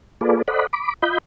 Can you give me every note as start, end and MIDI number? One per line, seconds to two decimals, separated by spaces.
0.21 0.42 58
0.21 0.42 65
0.21 0.42 68
0.21 0.42 69
0.21 0.42 71
0.21 0.42 74
0.48 0.67 69
0.48 0.67 72
0.48 0.67 74
0.48 0.67 75
0.48 0.67 78
0.48 0.67 83
0.73 0.94 83
0.73 0.94 86
1.02 1.18 65
1.02 1.18 75
1.02 1.18 83
1.02 1.18 91